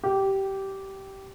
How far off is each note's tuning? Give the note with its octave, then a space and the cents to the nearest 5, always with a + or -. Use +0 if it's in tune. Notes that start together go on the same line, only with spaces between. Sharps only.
G4 -15